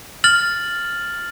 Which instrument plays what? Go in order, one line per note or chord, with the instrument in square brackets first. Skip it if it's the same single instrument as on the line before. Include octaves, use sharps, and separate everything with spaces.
[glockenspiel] F6 A6 F#7